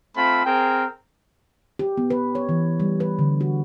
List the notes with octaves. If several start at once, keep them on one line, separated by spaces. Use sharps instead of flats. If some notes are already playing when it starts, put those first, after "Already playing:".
A3 C4 F4 B5
C4 G#4 A#4 G5
G4
B3
B4
C#5
E3
G3
B4
D3
F#4